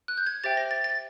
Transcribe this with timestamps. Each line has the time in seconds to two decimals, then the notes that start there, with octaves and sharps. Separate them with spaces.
0.08 F#6
0.17 G6
0.26 G#6
0.44 G4 C5 E5 G5 A6
0.57 A#6
0.71 A6
0.84 A6